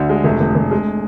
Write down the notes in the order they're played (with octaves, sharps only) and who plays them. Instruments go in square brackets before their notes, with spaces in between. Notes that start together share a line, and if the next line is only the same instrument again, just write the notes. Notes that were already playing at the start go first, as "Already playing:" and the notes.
Already playing: [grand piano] D2 D3 [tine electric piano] D4
[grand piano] G#3
[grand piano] F1 [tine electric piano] A3
[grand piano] F1
F1
G#3